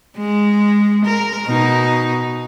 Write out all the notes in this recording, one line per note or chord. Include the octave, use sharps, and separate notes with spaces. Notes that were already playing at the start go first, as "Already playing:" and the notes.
G#3
A#4
B2 D#4